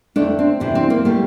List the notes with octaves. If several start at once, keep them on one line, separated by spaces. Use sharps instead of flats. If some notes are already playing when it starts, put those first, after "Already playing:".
F2 D3 A3 D4
C4
D2 C3 E3 D4
C4
A#3
D3 G3 A3